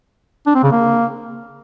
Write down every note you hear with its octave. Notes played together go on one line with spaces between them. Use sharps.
D4
C4
C#3
A#3